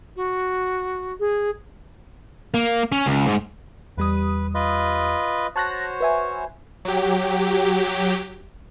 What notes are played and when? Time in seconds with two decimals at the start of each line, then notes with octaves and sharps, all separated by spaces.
0.16 F#4
1.20 G#4
2.54 A#3
2.92 C#4
3.06 C#2
3.27 G#2
3.97 E2 G3 B4 D#6
4.54 F4 B4 D#5
5.56 F#4 C5 C#5 A5 F#6 A#6
6.01 B4 E5 G#5
6.85 F#3 G4